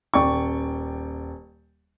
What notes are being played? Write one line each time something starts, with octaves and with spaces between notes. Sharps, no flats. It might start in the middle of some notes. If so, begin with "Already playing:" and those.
D#1 D5 G5 C#6